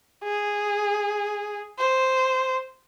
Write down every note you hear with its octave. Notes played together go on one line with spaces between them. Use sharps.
G#4
C5